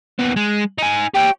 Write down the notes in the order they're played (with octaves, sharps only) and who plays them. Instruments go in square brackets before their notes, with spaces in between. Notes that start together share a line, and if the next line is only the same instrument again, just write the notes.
[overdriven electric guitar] D#2 B3
G#3
D#4 G#5
[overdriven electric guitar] G4 C#5 [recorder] G5